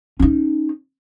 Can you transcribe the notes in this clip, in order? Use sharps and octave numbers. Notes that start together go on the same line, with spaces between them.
C#4 D#4